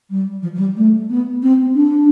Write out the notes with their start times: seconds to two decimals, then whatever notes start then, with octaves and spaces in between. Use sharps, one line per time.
0.10 G3
0.43 F3
0.55 F3
0.59 G3
0.77 A3
1.10 B3
1.43 C4
1.75 D4